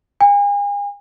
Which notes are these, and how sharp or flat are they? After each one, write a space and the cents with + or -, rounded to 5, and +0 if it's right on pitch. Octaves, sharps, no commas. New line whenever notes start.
G#5 -40